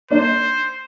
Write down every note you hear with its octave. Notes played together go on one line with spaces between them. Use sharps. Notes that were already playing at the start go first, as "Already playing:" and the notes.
A#3 D4 C5